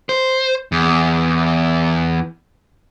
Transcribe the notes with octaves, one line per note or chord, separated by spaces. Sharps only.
C5
E2